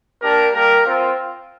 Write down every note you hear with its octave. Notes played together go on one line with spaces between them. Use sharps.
A#3 D4 G4 A#4
G3 A#3 G4 A#4
C4 F4